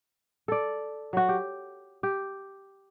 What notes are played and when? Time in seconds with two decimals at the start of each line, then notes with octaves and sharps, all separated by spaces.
0.48 A4 D5
1.13 F#3 F#4
1.29 G4
2.03 G4